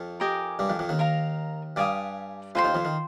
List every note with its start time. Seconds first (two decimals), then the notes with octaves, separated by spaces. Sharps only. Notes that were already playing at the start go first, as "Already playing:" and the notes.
Already playing: F2 F3
0.20 G4 A#4 D#5 G#5
0.59 G2 G3
0.69 F2 F3
0.79 F2 F3
0.89 D#2 D#3
0.99 A#4 F5 A#5
1.76 G2 G3 D5 F5 G#5 D#6
2.55 F2 F3 F4 C5 G5 C6
2.64 D#2 D#3
2.75 F2 F3
2.85 D#3